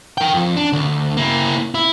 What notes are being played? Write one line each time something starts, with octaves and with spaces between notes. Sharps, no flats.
A#4 G5
F2
D4
D2
A#3 E4
E4